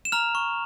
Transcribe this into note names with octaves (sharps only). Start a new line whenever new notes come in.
E7
A#5 F6 F7
C#6